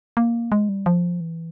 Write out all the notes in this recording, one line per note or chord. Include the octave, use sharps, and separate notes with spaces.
A#3
G#3
G3
F3
E3